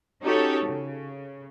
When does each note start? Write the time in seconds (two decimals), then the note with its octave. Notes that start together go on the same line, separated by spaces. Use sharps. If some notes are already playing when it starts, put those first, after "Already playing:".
0.22 C#4 D#4 F#4 G4 A4 C#5
0.64 C#3